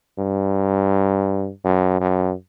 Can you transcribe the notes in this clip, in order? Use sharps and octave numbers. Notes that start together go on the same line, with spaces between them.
G2
F#2
F#2